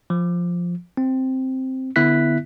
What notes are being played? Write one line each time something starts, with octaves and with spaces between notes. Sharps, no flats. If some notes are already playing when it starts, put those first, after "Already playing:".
F3
C4
D3 B3 E4 E5 F#6 B6